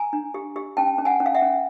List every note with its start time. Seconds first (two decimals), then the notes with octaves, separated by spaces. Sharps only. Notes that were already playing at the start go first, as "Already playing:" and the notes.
Already playing: G#5 A#5
0.13 D4
0.34 G4
0.56 G4
0.77 C#4 G5 A5
0.98 C#4
1.05 F#5 G#5
1.20 C#4
1.26 F5
1.35 E5 F#5
1.42 C#4